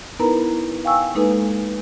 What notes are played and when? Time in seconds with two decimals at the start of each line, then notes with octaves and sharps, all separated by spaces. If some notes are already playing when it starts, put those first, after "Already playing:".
0.20 B3 D#4 E4 A#4 B4 A#5
0.85 F5 G5 G#5 C#6 E6
1.15 G#3 A#3 D#4 A4 B4